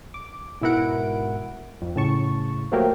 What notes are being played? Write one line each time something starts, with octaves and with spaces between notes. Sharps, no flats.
D6
G#2 B2 E4 A#4 F#5 D7
F2
A2 C#3 A5 C#6
F3 F#3 A3 A#3 G4 A#4